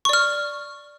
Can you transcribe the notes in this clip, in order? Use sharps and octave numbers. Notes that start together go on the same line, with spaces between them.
D5 C#6 F6